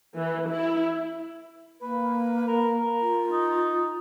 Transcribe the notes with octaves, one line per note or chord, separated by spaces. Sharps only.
E3
E4
A#3 B4
A#4
A#4
F4
D#4